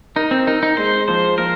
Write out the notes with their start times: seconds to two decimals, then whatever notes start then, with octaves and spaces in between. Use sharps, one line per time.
0.16 D#4 A#4
0.31 C4
0.47 D#4 A#4
0.63 D#4
0.77 G#3 C5
1.08 F3 C5
1.38 F3 A#4